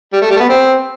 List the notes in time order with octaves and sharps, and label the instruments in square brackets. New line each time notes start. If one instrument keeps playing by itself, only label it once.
[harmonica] G3
A3
G3
A3
B3
C4